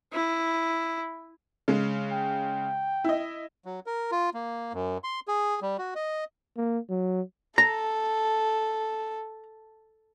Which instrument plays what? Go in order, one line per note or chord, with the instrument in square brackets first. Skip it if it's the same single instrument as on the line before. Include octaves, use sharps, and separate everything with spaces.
[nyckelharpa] E4
[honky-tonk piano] C#3 G#3
[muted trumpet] G5
[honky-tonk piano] E4 D#5
[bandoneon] F#3
A#4
F4
A#3
F#2
C6
G#4
G3
F#4
D#5
[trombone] A#3
F#3
[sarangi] A4 [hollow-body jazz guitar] A#5